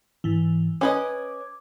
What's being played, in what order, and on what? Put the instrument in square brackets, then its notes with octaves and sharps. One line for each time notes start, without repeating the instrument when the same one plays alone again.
[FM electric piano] G#2 E3
[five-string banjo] C#4 B4 D#5 [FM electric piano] D6 G#6